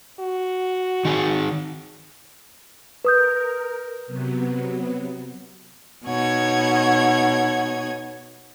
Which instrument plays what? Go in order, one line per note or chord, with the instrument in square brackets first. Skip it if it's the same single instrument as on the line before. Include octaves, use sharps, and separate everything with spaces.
[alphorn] F#4
[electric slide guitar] D#3 G#4
[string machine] A#4 [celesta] B4 D#6 G6
[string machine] C3 F#3 B3
[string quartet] B2 D#4 C#5 F#5 G#6